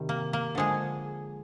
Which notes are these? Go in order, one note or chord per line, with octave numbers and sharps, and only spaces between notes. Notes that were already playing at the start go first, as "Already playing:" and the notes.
Already playing: C3 D#3 G3
A#3
A#3
D3 F3 G#3 G#4